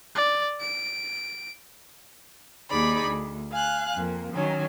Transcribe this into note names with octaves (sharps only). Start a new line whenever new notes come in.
D5
D7
D#2 D#4 G#4 D5 B5
D2
F5 G#5 F#6
F2 A#3
D#3 F#3 C#4